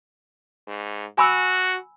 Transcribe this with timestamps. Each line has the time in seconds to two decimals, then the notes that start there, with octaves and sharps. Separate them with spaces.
0.68 G#2
1.18 F#4 G#5 B5 E6